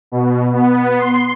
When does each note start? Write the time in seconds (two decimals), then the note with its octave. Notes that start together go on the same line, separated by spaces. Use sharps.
0.12 B2
0.53 B3
0.98 C6